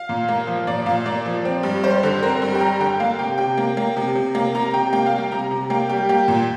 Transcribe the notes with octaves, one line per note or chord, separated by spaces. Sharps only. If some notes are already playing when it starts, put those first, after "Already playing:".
Already playing: F5
A#2
A#3
F3
A#2 D5
A#2 F5
A#3 D5
F3
C4
G2
G3 C5
D3
C4 A#4
G2
G5
G3 A#5
D3 G5
A#3 F5
C3 G5
C3 G5
A#3
A#3
C3
C3
A#3
C3 A#5
C3 G5
A#3 G5
F5
G3
G5
C3 A#5
C3
A#3 G5
G3 G4
A#3 G4
A#2